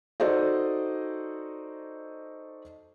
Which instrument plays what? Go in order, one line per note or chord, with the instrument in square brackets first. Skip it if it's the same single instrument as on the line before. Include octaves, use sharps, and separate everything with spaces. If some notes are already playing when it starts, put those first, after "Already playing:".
[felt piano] D#4 F#4 A4 C5 D5 D#5